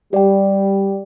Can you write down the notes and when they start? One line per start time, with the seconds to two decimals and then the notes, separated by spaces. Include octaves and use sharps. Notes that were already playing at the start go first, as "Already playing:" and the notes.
0.13 G3 G4 D5 G5